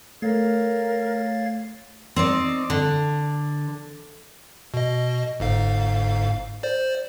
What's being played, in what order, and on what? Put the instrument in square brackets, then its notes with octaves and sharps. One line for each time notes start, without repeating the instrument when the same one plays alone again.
[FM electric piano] A3 [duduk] A#4 [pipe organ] C#5 F5 A6
[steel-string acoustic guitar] C4 D#4 D5
D3
[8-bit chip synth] B2 D#5
G1 G#2 F5
C5 D5